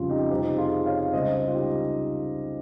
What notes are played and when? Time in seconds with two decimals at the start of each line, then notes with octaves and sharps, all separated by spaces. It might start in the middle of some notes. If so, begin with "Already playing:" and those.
Already playing: F2 C#3 G3 F4
0.10 D#4 G4
0.31 F2 C3 F3 D#4 G4
0.58 F4 G#4
0.86 C#5 F5
1.13 C#2 C#3 G3 C5 D#5
1.47 F4
1.55 D#4 G4